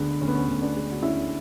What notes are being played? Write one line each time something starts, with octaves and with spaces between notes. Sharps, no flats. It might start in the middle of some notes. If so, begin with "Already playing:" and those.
Already playing: D2 D3 G#3 B3
D2 C#4
B3
C#4
D2
B3 D4
G#3
F#4
D3 C#4 E4